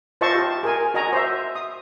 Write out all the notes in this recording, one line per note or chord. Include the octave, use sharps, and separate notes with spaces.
F4 C5 D#5 E5 A5 C#6
G4
G#4 A#4 G#5
F#4 D#5 G#5 A#5
C5 E5
D#6